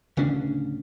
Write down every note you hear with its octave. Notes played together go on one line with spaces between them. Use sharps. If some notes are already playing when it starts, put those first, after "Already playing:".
D1 C#3 C#4 D4